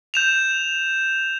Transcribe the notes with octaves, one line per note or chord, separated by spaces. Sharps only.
G6 E7 F7